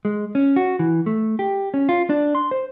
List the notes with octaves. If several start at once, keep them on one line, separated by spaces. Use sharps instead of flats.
G#3
C#4
F#4
E3
A3
G4
C#4
F4
D4
C6
C5